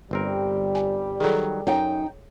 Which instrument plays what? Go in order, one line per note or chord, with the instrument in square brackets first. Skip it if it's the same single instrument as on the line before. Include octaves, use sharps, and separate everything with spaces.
[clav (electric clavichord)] G1 C4 A#4 [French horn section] G3 G4
[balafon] G#5
[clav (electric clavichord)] D#3 F#3 [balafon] G#4 A4
[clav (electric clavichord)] F#2 [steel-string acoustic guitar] D#4 G5 [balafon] C#5